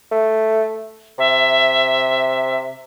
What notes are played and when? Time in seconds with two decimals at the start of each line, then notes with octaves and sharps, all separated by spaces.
0.11 A3
1.18 C3 E5